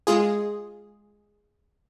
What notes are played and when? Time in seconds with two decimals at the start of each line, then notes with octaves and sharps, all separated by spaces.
0.07 G#3 F4 G#4